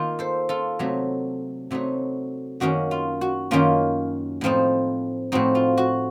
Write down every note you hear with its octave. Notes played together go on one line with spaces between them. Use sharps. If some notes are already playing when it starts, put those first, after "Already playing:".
Already playing: D#3 A#3 D#4 F4
A4 C5
F4 A4
C3 F#3 A3 D#4
C3 F#3 A3 D#4
F#2 D#3 A#3 C#4 F#4
F4
F#4
F#2 D#3 A#3 C#4 F4
A2 F3 C4 D#4
A2 F3 C4 D#4 F#4
F4
F#4